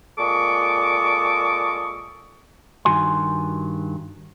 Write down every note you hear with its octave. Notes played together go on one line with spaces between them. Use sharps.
A#2 G#3 A4 C#6 D6
G2 D#3 F#4 G#5 C6